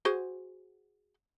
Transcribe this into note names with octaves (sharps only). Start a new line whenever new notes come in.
F#4 G#4 C5